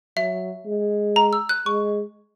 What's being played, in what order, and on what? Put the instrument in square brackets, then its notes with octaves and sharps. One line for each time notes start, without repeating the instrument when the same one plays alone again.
[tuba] F#3 [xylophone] E5
[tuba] G#3
[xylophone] A#5
E6
F#6
[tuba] G#3 [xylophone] C#6